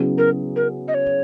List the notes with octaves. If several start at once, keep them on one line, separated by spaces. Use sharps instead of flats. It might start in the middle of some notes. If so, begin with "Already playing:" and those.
Already playing: C#3 F#3 B3 E4 G#4
A#4
A#4
D#5
C#5